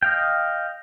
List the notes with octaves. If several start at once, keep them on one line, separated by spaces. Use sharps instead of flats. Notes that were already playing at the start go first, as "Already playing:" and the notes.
D#5 F5 G5